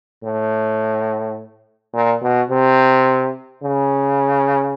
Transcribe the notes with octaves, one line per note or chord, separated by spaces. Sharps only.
A2
A#2
B2
C3
C#3